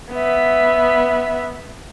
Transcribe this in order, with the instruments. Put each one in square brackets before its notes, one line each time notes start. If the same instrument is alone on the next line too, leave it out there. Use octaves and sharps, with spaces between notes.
[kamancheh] B3 E5